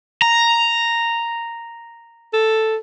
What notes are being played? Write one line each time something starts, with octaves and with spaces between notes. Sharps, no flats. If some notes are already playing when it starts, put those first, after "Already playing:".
A#5
A4